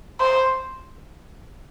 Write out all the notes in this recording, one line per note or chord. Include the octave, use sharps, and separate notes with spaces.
C5